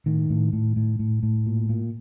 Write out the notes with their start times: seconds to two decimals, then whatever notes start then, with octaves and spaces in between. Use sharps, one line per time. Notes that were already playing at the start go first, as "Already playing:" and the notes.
0.06 A2 D#3
0.30 A2
0.53 A2
0.76 A2
0.99 A2
1.23 A2
1.46 A#2
1.69 A#2